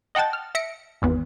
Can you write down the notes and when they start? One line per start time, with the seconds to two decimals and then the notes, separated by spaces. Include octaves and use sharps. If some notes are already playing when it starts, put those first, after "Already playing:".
0.15 D#5 F#5 G5 A5 A6
0.33 F6
0.55 E5 A#6 C#7 D7
1.02 G#1 E2 B3